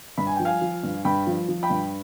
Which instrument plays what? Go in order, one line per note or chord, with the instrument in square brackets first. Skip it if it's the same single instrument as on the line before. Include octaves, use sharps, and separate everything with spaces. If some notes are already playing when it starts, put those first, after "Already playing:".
[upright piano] G2 B5
G#5
F3 G5
F5 G#5
F3
G2
G2 G5 B5
F3
F3
G5 B5
G2